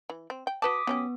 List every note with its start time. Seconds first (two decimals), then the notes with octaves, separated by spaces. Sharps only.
0.10 E3
0.30 C4
0.47 G5
0.62 F#4 B4 A5 D6 D#6 B6
0.87 F#3 B3 C#4 G4